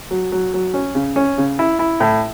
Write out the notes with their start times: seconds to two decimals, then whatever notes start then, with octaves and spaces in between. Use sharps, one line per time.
0.11 F#3
0.32 F#3
0.54 F#3
0.74 C#4
0.95 C#3
1.16 C#4
1.38 C#3
1.59 E4
1.79 E4
2.00 A2